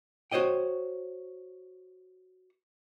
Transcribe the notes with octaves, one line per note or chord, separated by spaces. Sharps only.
F#4 C5 C#5 D#5 G5